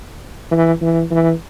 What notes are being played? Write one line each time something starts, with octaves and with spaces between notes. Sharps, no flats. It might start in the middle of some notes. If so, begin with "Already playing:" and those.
E3
E3
E3